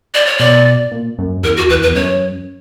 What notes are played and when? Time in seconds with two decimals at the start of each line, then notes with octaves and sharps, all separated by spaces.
0.14 D5
0.26 C#5
0.38 B2 D5
0.91 A#2
1.19 F#2
1.43 E2 A#4
1.57 F#4
1.69 E2 B4
1.83 B4
1.88 E2
1.95 F#2 C#5